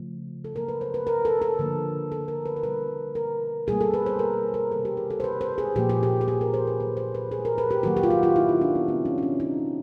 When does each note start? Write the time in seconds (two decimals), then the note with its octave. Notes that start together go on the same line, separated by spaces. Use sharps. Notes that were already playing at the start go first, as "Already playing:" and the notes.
Already playing: C#3 F3 A3
0.44 A4
0.55 B2 F#3 A#3 A#4
0.68 B4
0.81 C5
0.94 B4
1.07 A#4
1.25 A4
1.42 A4
1.59 D3 F3 A#3
2.12 A4
2.28 A#4
2.46 B4
2.56 A#4
2.63 B2 G3 A#3 B4
3.15 A#4
3.67 B2 G3 A#3 G#4
3.81 A4
3.94 B4
4.06 C5
4.19 A#4
4.54 A#4
4.71 C3 D#3 G3 A#3 A4
4.85 G4
4.97 G#4
5.10 A4
5.20 C5
5.24 B4
5.41 C5
5.58 G#4
5.75 A#2 F3 A#3 G4
5.89 G#4
6.03 G4
6.21 G#4
6.28 G4
6.41 A#4
6.54 C5
6.67 B4
6.80 D#3 F#3 A#3 C5
6.97 C5
7.15 B4
7.31 G#4
7.45 A#4
7.58 B4
7.71 G4
7.83 D#3 F#3 A#3 F#4
7.97 G4
8.03 F4
8.10 F#4
8.23 F4
8.36 E4
8.49 D#4
8.61 D4
8.75 B3
8.87 C3 F3 A#3 C4
9.05 C#4
9.18 C#4
9.23 D4
9.40 D#4